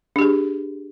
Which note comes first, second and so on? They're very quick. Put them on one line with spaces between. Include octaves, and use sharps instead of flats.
D4 G4 G#4